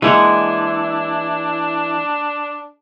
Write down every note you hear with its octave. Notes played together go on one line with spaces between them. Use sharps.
E3 G#3 A#3 D4 E4 F#5